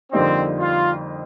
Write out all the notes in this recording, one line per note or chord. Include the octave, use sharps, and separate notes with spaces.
F2 D3 G3 A#3 C4 D#4
F4